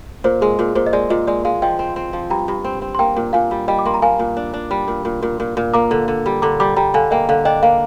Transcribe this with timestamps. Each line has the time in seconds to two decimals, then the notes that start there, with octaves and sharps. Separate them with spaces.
0.24 A#2 C5
0.41 G#3 G#4
0.59 A#2 A#4
0.75 A#2 C5
0.87 D#5
0.93 G#3 D5
1.10 A#2 D#5
1.27 G#3 D5
1.45 G#3 F5
1.62 F3 D#5 G5
1.79 C4
1.96 C4
2.13 F3
2.30 G2 G5 A#5
2.48 G2
2.64 C4
2.82 C4
2.95 C6
2.99 A#3 G5 A#5
3.16 A#2
3.33 A#2 F5 G#5
3.51 G3
3.68 G3 D#5 G5
3.79 D6
3.85 A#3 C6
3.94 A#5
4.02 A#3 F5 G#5
4.19 A#2
4.37 D4
4.54 D4
4.71 G3
4.88 A#2
5.05 A#2
5.23 A#2
5.40 A#2
5.57 A#2
5.74 A#3 A#5 D6
5.91 D3
6.08 D3
6.26 G3
6.42 D3 A#5 D6
6.60 G3 A#5 D6
6.76 G3 G5 A#5
6.94 D3 F5 G#5
7.11 A#3 D#5 G5
7.29 D3 F5
7.45 D4 D#5 G5
7.63 A#3 F5